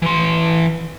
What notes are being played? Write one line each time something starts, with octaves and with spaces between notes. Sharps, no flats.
E3 C6